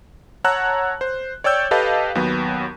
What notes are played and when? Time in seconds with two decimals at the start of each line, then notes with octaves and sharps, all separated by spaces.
0.44 C#5 F#5 A5 A#5 E6 F#6
1.01 C5
1.44 C#5 D5 G5 E6 G6
1.71 G4 A4 B4 D#5 F5 A5
2.15 D#2 F#3 B3